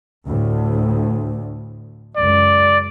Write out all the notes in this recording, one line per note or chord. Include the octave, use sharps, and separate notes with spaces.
D2 A2
C#2 F#2 D5